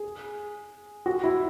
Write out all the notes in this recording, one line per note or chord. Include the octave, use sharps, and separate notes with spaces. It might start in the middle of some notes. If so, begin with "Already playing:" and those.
Already playing: G#4
F#4
E4